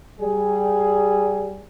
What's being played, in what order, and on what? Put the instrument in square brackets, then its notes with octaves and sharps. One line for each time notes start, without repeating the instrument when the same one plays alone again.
[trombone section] G3 G#4